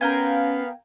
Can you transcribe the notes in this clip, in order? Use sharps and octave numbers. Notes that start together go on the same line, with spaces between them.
B3 C#4 A#4 F5 G5 G#5